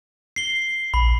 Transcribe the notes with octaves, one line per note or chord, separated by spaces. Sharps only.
C7 G7
A#1 B5